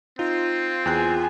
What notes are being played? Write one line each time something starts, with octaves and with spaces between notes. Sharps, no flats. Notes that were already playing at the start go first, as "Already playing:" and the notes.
C4 D#4 F4
E2 G#4 G5 G#5 F#6